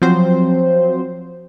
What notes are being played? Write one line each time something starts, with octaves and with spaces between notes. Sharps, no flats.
F3 F#3 C4 C5